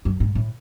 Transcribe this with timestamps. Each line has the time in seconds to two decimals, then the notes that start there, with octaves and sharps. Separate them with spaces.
0.05 F#2
0.20 G#2
0.35 A2